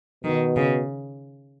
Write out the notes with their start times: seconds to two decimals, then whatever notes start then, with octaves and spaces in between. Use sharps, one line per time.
0.24 B2 D#3
0.57 C#3